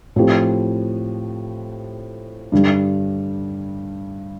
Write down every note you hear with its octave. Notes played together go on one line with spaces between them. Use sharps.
A2 F3 C4 G4
G2 D3 G3